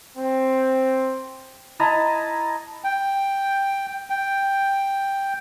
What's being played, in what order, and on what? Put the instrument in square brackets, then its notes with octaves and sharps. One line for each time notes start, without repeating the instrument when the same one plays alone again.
[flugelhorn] C4
[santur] E4 D#5 A5 A#5
[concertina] G5
G5